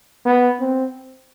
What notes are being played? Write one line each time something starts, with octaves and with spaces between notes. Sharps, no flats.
B3
C4